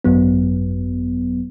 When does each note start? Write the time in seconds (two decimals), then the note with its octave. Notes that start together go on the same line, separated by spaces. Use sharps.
0.04 G#1 F#2 F#3 B3